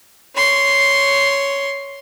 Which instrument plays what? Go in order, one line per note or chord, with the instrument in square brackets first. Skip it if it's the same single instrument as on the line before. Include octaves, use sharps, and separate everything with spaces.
[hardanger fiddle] C#5 C6